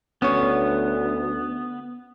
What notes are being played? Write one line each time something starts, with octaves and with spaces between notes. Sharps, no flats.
D2 B3 C#4 C#5